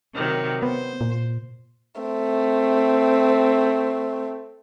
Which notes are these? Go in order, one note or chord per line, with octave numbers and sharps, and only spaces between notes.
C3 D#3 F#3
B3 C5
A#2
A3 C4